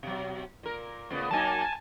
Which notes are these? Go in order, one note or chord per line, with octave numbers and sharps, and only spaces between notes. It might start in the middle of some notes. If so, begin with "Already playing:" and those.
B2 F#3
A#2 A#4
A2 C#3 B3
F#3 A#3 D#4 G#5 A5